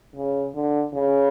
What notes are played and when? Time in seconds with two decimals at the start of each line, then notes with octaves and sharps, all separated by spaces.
0.16 C#3
0.54 D3
0.93 C#3